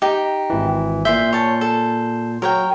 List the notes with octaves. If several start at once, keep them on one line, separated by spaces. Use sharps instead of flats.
D#4 G4
G#1 E3
A#2 E5 C6 G6
C#5 A5
A4
F#3 A#4 C#5 G5